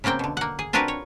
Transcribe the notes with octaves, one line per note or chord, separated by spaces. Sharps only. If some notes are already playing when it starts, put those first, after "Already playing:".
C#3 F#3 A#3 C4 G5
B2 D3
A#3 F#5
G#4
C4 D4 F4 F#4 A#4 B4
C#5